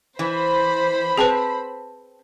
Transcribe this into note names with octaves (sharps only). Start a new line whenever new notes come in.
E3 C5 B5
C4 G#4 B4 A5